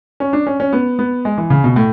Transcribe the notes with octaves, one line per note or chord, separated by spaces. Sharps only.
C#4
D4
C#4
C#4
B3
B3
G#3
E3
C#3
B2
A2